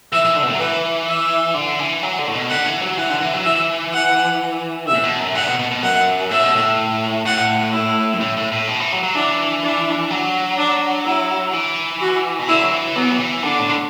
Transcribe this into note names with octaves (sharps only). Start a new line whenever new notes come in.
E3 E5
E3
D3
B2
A2
F#3
E3 B4
E5
D3
E3
F#3
D3
A2
B2
D3 F#5
E3
F#3
E3 F#5
D3
E3
F#3
E3 E5
F#5
E5
A2
B2
F#2
A2 F#5
D3
B2
B2
B2
F#2 F#5
A2 E5
B2
A2
A2 F#5
E4
F#2
A2
A2
A2
B2
E3
F#3
F#3
E3 D4
D4
F#3
D4
E4
E3
F#4
B2
D3 E4
F#3
E3
F#3 B3
E3
F#3
E3
D3 D4
A2
D3